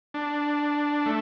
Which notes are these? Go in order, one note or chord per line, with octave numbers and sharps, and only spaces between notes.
D4
A3